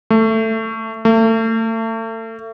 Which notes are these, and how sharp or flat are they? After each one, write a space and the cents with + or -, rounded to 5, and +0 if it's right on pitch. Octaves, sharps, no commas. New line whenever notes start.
A3 +15
A3 +35